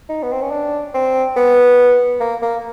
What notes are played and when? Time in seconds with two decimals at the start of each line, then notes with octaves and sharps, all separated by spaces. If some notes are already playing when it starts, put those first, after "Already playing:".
0.09 D#4
0.23 B3
0.32 C4
0.42 C#4
0.51 D4
0.94 C4
1.36 B3
2.20 A#3
2.42 A#3